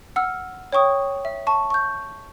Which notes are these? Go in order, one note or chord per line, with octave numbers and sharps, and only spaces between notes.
F#5 E6 F6
C#5 G5 C#6 D#6
E5
A5 C#6
C#6 G6